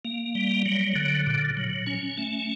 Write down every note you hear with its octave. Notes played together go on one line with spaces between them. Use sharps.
A#3
G3
F#3
D3
A#2
F#3
C#4
A3